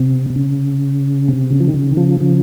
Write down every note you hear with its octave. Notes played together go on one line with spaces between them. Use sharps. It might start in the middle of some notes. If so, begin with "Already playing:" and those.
Already playing: C3
C3
C#3
C3
C#3
F3
D#3
C#3
D#3
C#3 F3
C#3 F3